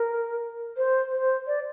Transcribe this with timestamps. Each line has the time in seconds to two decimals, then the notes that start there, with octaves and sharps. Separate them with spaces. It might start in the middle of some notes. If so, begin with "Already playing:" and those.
Already playing: A#4
0.77 C5
1.12 C5
1.47 D5